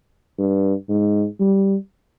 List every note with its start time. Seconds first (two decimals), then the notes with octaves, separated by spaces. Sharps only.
0.38 G2
0.89 G#2
1.40 G3